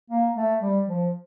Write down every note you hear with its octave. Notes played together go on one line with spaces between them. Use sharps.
A#3
A3
G3
F3